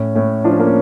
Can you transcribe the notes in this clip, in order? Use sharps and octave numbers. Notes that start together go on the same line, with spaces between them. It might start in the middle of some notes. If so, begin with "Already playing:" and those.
Already playing: A2 C#4
A2 C#4
F3 D4
C#4
A#3
C#4